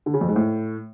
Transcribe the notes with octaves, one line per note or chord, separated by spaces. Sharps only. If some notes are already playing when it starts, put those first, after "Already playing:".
D3
C#3
F2
G#2
A2